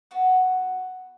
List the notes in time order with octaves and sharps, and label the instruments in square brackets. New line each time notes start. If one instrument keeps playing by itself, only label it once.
[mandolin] B3 F#4 B4